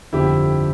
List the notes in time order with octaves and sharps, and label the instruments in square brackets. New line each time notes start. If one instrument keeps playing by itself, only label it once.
[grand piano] G1 F2 D3 F3 E4 G4